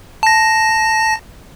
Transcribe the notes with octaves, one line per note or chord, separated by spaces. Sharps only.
A5 A#6